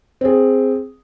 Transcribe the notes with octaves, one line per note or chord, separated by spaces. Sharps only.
C4 G#4